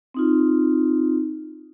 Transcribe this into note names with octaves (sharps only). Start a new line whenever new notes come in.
C4 D#4 F4